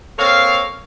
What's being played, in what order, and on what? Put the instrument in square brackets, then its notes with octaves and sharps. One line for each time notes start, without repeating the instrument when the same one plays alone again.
[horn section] A#3 C4 A4 C#5 F5